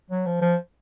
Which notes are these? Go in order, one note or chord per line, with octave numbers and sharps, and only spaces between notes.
F#3
F3
F3